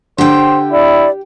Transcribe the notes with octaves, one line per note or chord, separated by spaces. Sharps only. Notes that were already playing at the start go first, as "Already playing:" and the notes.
D3 G4 C5 G5
E4 D5